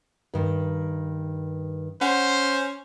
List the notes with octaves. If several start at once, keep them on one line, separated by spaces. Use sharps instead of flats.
G2 D#3
C#4 C5 F#5